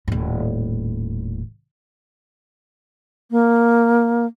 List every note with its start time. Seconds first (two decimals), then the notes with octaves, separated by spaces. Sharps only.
0.08 D#1 A2
3.31 A#3